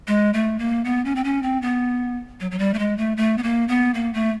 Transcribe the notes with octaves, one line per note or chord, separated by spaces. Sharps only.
G#3
A3
A#3
B3
C#4
C4
C#4
C4
B3
F#3
F#3
G3
A3
G#3
A3
A3
B3
A#3
B3
A#3
A3